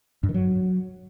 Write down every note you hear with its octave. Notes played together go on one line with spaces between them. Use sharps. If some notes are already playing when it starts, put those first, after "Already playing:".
G2
D#3
F#3